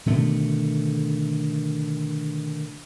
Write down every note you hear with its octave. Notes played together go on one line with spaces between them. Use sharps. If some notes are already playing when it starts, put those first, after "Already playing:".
B2 D3 D#3 A3